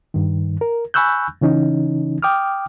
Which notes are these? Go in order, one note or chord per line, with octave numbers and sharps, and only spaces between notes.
G2 D#3
A#4
G#5 B5 C#6 E6 F#6 G6
C#3 E3 C#4 D#4
G5 D6 D#6 F6